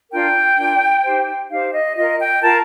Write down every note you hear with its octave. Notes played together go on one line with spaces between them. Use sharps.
D4 F4 A#4 G5
D4 F4 A#4
D#4 G4 C5
D#4 G4 C5 F5
D#5
F4 A#4 D#5
G5
F4 A#4 A5